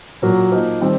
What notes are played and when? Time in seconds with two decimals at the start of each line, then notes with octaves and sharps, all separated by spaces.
0.22 A#2 F#3 A#3
0.52 F3 A#3 D#4
0.81 D#3 G3 C4